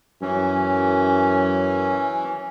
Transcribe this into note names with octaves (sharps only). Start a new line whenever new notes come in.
F#2 E3 C#4